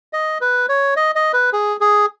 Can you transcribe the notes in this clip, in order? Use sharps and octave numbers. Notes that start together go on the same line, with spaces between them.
D#5
B4
C#5
D#5
D#5
B4
G#4
G#4